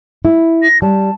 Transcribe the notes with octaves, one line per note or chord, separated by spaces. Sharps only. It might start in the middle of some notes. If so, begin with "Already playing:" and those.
E4
A#6
G3 A5